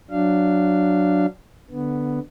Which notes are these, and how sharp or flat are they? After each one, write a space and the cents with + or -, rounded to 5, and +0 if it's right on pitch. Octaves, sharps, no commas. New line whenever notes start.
F#3 +0 D4 +0 F5 -20
D3 +0 B3 +0